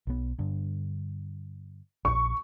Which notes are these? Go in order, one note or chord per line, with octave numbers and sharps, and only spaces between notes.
B1 B3
G2 D3
A#1 C#6